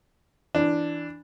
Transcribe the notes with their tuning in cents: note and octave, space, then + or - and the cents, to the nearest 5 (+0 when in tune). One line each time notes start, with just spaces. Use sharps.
E3 +0 D4 +0